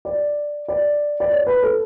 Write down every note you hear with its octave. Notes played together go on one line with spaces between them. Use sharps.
D5
D5
D5
C#5
B4
A4